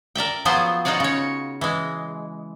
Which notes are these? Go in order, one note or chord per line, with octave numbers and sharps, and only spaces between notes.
A#4 D5 E5 G5
F3 F#3 B3 F4 G#4 C5
D#4 F4 F#4 C#5 D5
C#3 C#5
E3 G#3